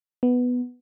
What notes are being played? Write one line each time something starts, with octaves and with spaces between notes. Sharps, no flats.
B3